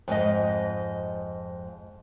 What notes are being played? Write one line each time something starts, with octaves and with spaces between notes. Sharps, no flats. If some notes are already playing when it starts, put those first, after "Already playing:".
F2 G#2 D#5